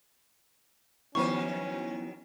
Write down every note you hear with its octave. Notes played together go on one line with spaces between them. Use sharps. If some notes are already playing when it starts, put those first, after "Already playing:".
D#3 F3 F#3 B3 C#4 E4 C5 C#6